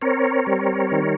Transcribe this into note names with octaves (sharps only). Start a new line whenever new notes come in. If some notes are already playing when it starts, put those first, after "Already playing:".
C4 A#4 C#5
G3
D#3